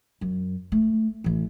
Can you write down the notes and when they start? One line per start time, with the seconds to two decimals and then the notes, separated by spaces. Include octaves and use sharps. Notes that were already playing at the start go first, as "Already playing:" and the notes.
0.21 F#2
0.72 A3
1.24 A1 E3